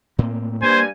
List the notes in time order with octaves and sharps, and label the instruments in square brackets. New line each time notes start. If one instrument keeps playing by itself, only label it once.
[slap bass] A2 A#3 C4
[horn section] G2 G#5 [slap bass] A#3 [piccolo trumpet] C5